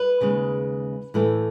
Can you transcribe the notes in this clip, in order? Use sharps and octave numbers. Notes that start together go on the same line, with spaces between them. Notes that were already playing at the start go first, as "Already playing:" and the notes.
Already playing: B4
D#2 C#3 G#3
A2 E3 A3